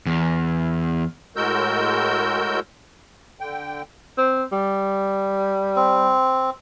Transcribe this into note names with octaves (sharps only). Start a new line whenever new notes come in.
E2
A2 G#3 F#4 A#4 E6 G6
D3 G5
C4
G3
C4